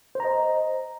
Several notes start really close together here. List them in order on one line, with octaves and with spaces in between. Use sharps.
C5 A#5 D#5